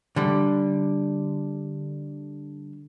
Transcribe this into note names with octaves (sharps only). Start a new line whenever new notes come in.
D3 G3